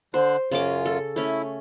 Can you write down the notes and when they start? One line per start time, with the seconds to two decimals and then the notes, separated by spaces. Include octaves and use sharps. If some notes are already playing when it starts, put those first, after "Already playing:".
0.14 D3 C5 F#6
0.51 F#2 C#3 C#4 F4 D6
0.86 A4
1.16 A3 C#4 E4